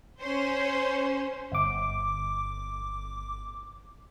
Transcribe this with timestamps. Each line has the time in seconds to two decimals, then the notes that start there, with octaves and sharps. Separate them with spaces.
0.20 C#4 C5
1.52 G1 D6